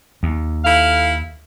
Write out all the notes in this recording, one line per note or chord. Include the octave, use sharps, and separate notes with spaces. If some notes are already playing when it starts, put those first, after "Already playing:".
D#2
E4 A4 F5